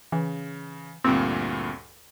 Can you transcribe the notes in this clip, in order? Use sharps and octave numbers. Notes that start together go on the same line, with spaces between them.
C#3 E3
D2 G2 A#2 C4